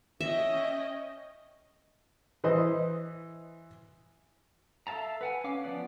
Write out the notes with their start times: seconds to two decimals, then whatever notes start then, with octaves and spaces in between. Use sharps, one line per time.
0.21 C#4 D#5 E5 G5
2.44 E3 B4 C5 D#5
4.87 A4 E5 F5 A5 A#5
5.21 B4 F#5 G#5
5.44 C#4 F5 D6
5.64 F3 B3 D5 F#5